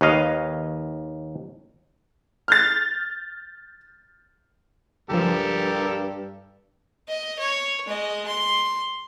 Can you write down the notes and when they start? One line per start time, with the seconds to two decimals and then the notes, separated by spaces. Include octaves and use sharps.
0.01 D#2 B4 C#5 D#5 F5
2.48 F6 G6 A6
5.10 C#2 G2 F3 G4 A4 A#4
7.08 D#5
7.38 C#5
7.87 G#3 D#5
8.27 C6